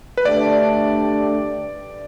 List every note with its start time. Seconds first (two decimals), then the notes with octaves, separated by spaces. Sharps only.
0.17 B4
0.25 D3 A3 D4 G4 D5